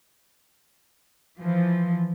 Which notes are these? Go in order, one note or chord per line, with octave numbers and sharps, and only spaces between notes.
E3 F3